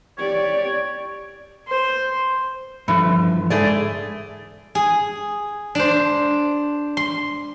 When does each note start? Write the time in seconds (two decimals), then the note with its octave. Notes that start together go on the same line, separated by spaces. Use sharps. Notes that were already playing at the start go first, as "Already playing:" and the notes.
0.18 G4 C#5 D5
1.67 C5
2.88 G2 D3 E3 F3
3.50 G#2 A3 G#4 D5
4.75 G#4
5.75 D4 C5
6.97 C6